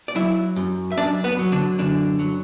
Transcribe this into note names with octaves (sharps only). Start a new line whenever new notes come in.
D5
F#3 E4 E5
F#2
E5
F#2 D4 D5
B3 B4
F#3
D3 D4
F#2 D3 D4
F#3